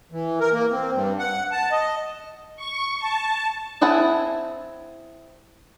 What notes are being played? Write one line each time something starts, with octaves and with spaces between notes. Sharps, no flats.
E3
A#4
A#3
C4
G2
F#5
A5
D#5
C#6
A5
C4 E4 G#4 F#5 A5